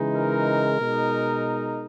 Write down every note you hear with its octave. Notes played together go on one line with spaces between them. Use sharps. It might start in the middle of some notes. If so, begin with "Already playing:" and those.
Already playing: C#3 E3 G#3 D#4
A#4
B2 G#3 D#4